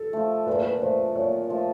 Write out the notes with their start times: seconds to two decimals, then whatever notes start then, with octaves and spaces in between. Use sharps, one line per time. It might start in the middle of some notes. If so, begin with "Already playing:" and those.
Already playing: A4
0.13 F3 A3
0.47 A#2 B4
0.54 A#4
0.62 B4
0.81 F3 A3 C5
1.16 A#2 C#5
1.49 F3 A3